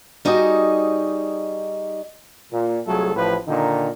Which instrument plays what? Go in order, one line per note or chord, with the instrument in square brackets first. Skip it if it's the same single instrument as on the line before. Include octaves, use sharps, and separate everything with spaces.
[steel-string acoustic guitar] G3 D#4 F#4 G#4 D#5
[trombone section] A#2
C2 F#3 A3 F4 G#4 A4
A1 A2 F3 E4 B4
A#2 D3 D#3 D#4